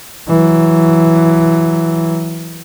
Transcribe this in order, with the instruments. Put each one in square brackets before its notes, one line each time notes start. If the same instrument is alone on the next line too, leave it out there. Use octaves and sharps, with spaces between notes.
[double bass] E3 F#3